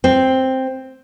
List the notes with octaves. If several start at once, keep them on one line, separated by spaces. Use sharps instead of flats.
C4